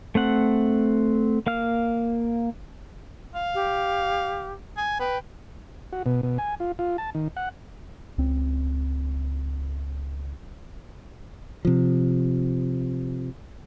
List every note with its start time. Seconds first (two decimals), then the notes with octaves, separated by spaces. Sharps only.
0.15 A3 C4 F#5
1.47 A#3 F5 F6
3.35 F5
3.55 G4
4.77 G#5
5.00 B4 G5
5.93 F#4
6.06 B2
6.23 B2
6.38 G#5
6.60 F4
6.79 F4
6.98 A5
7.15 D#3
7.37 F#5
8.18 C#2 C4
11.65 C3 F3